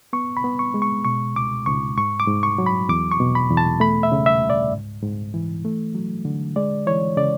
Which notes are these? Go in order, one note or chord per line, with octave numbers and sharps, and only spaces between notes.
B3 C#6
B5
B3
C#6
G#3
C#6
B2 C#6
C#2 D6
C#2 C#6
G#2 C#6
D6
G#2
C#6
F#3
B5
E2 D6
C#6
B2
B5
E2
A5
A3 B5
E5
C#3
E5
C#2
D5
G#2
G#2
E3
A3
F#3
D3
G#3 D5
E3 C#5
C#3 D5